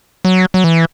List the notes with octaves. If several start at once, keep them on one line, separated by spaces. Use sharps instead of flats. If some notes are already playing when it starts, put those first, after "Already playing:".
F#3
F#3
E3